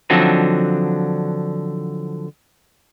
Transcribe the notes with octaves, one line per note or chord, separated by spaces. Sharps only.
D3 F3 F#3 C4 D4 D#4